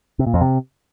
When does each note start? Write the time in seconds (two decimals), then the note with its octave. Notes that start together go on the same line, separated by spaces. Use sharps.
0.19 C3
0.27 A#2
0.34 F2
0.41 C3